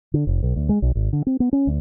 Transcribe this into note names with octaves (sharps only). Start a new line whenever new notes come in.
D3
F1
B1
D2
G#3
B1
G#1
D3
C4
B3
C#4
D2